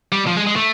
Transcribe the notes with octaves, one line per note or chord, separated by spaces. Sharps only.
G3
F3
G#3
G#3
A3